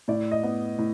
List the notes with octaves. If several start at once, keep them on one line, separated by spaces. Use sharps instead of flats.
A2 D5
D#5
B3
A2